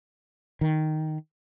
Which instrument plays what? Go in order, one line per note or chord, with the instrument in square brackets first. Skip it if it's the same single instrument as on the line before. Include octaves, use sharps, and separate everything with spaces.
[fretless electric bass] D#3